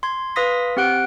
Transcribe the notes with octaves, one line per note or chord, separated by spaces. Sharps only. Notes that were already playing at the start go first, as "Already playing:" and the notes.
C6 G#6
B4 F5 C6 D#6 A#6 B6
C4 G4 F#5 F#6 D7